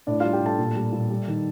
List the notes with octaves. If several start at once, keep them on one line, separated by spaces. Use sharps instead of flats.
A2 D4 D5
G3 F4 F5
G4 G5
A2 A4 A5
A#2
G3
A#2
G3
D#3